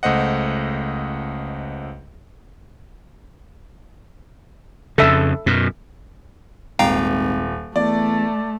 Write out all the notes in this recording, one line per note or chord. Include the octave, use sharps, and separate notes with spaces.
C#2 A3 C5 D#5 F#5
F2 C#3 A4 E5
F#2 B2
D#1 G#1 F5 G5 A#5
E2 A3 D5